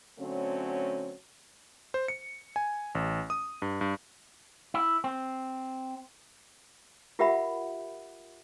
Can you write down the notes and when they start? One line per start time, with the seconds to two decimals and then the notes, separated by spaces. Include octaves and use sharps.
0.19 D3 F#3 A3 C4 C#4
1.94 C5
2.08 C#7
2.56 G#5
2.95 A1
3.30 D#6
3.62 G2
3.81 G2
4.74 E4
5.04 C4
7.19 F4 G4 A#4 E5 F#5 B5